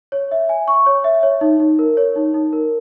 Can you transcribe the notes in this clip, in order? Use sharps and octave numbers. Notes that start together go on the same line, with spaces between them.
C#5
E5
G#5
C#6
C#5
E5
C#5
D#4
D#4
A#4
C#5
D#4
D#4
A#4